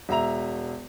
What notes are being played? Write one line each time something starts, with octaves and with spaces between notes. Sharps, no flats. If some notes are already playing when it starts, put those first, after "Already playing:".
E1 E5 A#5 F7